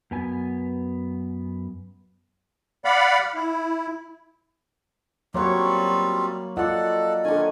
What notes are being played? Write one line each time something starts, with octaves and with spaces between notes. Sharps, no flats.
F#2 B3 G#5
D5 F5 F#5 B5
E4
F#3 G3 A#3 C4 F4 C#5 F#5
F4 A4 D5 D#5 F#5
D3 D#3 C#4 G#5